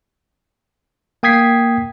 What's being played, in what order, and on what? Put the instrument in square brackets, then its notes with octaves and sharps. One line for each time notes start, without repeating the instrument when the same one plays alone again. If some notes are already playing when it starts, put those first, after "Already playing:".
[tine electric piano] A#3 G5 D#6 G#6 B6 C7